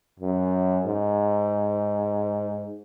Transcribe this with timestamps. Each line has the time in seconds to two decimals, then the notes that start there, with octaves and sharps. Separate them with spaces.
0.20 F#2
0.86 G#2